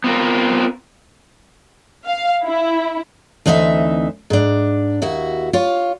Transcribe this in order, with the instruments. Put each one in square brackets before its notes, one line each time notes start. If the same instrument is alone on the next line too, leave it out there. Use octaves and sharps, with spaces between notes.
[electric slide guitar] B3 C4 F4 A#4
[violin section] F5
E4
[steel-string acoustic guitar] D2 E3 C4 D#4 D#5 E5
G#2 D4
D#2 E4 F#4
F4 C#5